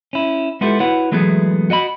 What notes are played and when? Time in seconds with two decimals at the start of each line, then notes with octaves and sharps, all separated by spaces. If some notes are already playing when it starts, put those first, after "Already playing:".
0.13 C#4 E4
0.61 G#3 B3 E4 F4 G4 A4
0.80 E4 F#4 B4 C#5 F#5
1.12 E3 F#3 G#3 A3 B3 G#4
1.70 F#4 D#5 E5 B5